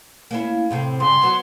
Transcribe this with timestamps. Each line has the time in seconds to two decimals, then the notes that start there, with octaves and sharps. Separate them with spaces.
0.31 A#3 C#4 E4
0.71 A2 C3 C4
1.00 G2 C#3 C6
1.22 F#3 B3 F#4